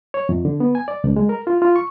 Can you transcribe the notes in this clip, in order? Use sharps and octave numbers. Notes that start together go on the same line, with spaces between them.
C#5
F2
D3
B3
G#5
D5
C#2
G#3
A#4
F4
F4
C#6